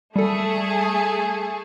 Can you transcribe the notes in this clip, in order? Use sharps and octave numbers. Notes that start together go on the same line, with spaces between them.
G3 A3 G#4 A4 A5